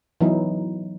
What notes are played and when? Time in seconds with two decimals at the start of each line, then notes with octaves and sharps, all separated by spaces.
0.21 E3 F#3 B3 D#4 E4